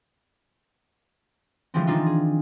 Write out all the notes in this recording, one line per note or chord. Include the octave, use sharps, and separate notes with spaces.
D3 E3 F3 G3 G#3 C4
D#3 F3 C4 D4 D#4 F4
G#4